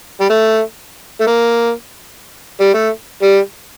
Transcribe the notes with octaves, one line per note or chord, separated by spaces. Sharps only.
G3
A3
A3
A#3
G3
A3
G3